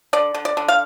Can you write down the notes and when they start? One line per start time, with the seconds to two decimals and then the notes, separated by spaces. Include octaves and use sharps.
0.13 D3 D5
0.34 D3
0.45 D5
0.57 D3
0.68 F5